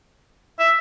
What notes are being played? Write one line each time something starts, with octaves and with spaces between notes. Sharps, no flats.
E5